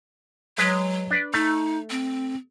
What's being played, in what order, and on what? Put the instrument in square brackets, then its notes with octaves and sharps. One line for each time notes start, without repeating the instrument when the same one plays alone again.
[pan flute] F#3 [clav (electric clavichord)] G#3 B4
[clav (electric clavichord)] D4 B4 D5
[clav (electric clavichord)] A3 [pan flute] D#4
[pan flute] C4